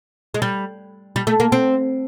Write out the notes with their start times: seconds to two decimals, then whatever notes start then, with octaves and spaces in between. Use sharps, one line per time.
0.34 G#3
0.42 G3
1.16 G3
1.27 A3
1.40 A#3
1.52 C4